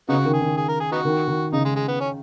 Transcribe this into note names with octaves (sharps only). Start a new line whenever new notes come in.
C#3 B3 D#4 F#4
D#3
G#4
D#3
G#4
A#4
G#4
B3 D#4 F#4
D#3
D#3
C#3 D#4
G#3
G#3
B3
C#4